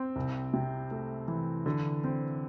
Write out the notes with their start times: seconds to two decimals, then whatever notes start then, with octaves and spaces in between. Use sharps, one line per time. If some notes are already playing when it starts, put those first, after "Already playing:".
Already playing: C4
0.16 C2
0.54 C3
0.91 A3
1.28 E3
1.66 D3
2.04 C4